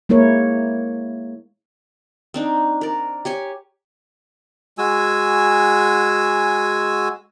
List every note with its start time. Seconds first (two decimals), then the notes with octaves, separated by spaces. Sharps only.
0.09 G#3 A#3 E4 A#4 C#5
2.34 C4 D4 D#4
2.81 A#4 D5
3.25 G4 C#5 G#5
4.78 G#3 F#4 G#5 E6